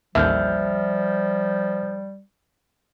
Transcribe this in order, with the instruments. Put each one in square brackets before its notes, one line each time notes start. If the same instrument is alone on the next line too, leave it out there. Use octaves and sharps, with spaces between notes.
[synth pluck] A1 D#2 [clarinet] F3 [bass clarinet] G3 [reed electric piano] E5 F6 G6